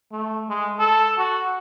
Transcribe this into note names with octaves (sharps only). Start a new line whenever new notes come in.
A3
G#3
A4
F#4